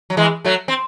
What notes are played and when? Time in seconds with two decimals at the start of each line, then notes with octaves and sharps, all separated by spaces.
0.10 F#3
0.17 E3 G#3
0.45 F#3 A3
0.68 C4